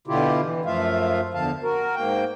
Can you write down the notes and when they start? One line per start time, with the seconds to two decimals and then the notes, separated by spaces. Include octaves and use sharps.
0.07 B2 D3 E4 F4 G4
0.42 E3
0.65 F#2 F3 A3 F4 E5 F5
1.34 E2 D3 F3 F5 A5
1.63 F#4 A#4
1.95 G#2 A#3 G5